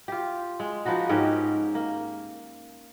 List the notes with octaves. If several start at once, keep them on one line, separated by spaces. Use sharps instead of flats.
F4 G4
G#3
F3 B3 D#4 F#4
G#2 C#4 G4 A#4
A#3